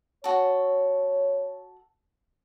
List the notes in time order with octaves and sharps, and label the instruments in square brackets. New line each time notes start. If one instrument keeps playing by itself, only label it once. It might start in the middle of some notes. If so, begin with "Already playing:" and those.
[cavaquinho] F#4 A4 [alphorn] C#5